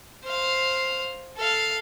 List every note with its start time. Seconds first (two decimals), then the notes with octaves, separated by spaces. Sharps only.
0.24 C5 F5
1.37 A4 F5